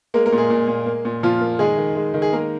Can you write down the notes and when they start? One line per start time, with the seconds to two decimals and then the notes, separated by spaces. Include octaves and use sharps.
0.14 G#3 A#3 A#4
0.26 A#3 A#4
0.32 A#2
0.38 G#3 G#4
0.50 A#2
0.68 A#2
0.86 A#3
1.05 A#2
1.23 A#2 F3 F4
1.41 A#3
1.59 D#3 G#3 G#4
1.77 D#3
1.95 G#3
2.14 D#3
2.22 G#4
2.32 G#3 A#3 A#4